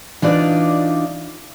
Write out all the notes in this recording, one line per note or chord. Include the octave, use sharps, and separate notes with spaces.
E3 D4 D#4 F4 D5